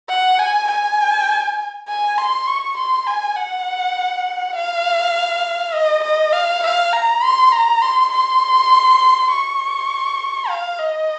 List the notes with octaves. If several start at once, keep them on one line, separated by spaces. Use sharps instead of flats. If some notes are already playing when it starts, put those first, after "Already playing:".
F#5
G#5
G#5
G#5
C6
C#6
C6
G#5
F#5
F5
D#5
D#5
F5
F5
A#5
C6
A#5
C6
C6
C#6
F5
D#5